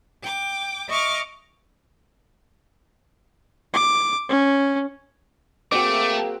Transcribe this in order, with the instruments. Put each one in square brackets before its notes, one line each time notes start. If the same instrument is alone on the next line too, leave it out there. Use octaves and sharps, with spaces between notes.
[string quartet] G5 D6
D#5 E5 C#6 D6 F6
[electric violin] D6
C#4
[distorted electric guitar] A3 [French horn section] A#3 G#4 [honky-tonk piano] C4 F#4 G5 [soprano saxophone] D6